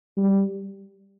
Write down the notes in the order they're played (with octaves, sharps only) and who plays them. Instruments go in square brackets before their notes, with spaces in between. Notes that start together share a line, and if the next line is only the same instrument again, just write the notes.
[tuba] G3